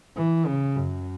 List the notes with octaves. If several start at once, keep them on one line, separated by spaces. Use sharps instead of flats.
E3
C#3
F#2